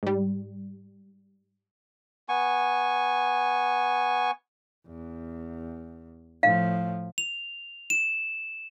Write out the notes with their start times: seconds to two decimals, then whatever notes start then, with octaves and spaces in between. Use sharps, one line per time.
0.03 G#2 G3
2.29 B3 G#5 C#6
4.87 E2
6.43 A2 F3 F5
7.18 F7
7.90 E7